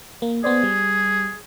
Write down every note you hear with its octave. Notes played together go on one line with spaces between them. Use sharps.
A#3
B3 G#4 C5 D5
G3